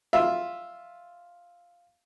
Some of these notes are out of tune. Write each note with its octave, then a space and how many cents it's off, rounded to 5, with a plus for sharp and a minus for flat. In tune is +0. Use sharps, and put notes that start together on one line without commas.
F4 +0 E5 +0